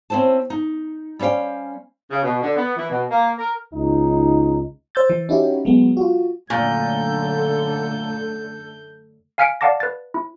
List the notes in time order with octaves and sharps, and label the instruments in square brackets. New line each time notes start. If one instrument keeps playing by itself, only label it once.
[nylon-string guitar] C4 C#4 E4 C5 A5
D#4
G3 C#4 C5 F5 G5
[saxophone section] C#3
B2
D3
B3
E3
B2
A#3
A#4
[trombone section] C#2 D#4
[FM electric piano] C5 E6 G6 A6
E3
C#4 D#4 E4 F#4 G4
F#3 G#3 B3
F4 F#4
[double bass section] F#2 D3 [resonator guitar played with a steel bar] A#2 [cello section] A3 A4 [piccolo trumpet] G6
[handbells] F5 G#5 F6 B6 C#7 D7
D5 F5 F#5 A5 D6 A#6
B4 A6
E4